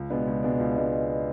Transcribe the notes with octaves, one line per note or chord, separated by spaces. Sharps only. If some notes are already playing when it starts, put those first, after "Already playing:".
Already playing: C#2
B2 G#3 B3 D4
C#2
B2 G#3 B3 D4
C#2
B2 G#3 B3 D4